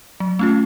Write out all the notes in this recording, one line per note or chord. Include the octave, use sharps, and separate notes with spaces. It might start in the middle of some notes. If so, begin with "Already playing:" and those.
F#3
A3 C#4 F4